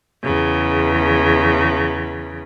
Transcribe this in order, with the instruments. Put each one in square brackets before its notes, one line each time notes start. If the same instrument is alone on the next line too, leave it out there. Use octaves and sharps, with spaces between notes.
[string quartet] E2 C#3